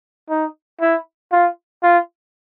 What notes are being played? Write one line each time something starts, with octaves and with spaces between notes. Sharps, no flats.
D#4
E4
F4
F4